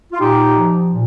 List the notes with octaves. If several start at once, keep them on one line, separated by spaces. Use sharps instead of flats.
F4
A#2 D#4 G4
F3
A#2